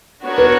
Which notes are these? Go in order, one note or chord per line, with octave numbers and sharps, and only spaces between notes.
B3 D4 F#4 A#4 C#5
B4